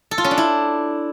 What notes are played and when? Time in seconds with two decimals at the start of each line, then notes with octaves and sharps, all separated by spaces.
0.11 A4
0.18 F4
0.24 C#4
0.31 D4
0.38 E4